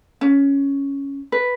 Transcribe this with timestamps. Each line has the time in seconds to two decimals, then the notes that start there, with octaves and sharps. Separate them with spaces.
0.21 C#4
1.32 B4